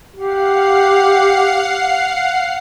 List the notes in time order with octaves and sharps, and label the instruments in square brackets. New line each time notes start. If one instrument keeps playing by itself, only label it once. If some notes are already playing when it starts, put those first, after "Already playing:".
[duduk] G4 [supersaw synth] F5 F#5 C7